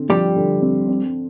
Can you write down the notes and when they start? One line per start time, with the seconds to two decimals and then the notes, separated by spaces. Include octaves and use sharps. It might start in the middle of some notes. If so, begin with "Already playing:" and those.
Already playing: D3 C4
0.09 F3 G3 G4
0.36 D3
0.61 C4
0.88 C4